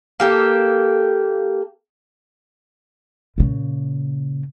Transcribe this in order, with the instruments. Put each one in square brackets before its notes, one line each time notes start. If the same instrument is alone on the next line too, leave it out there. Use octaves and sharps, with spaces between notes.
[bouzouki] A#3 G4 A4
[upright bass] A#2 C#3